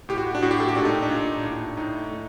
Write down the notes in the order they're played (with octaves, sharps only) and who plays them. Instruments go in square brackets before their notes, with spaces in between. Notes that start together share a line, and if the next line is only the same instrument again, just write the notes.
[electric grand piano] A2 G4
F#4
D4
A2 F#4
G4
A4
G4
A#2 D4
D#4
D4
A#2
A2
A2 D#4
A2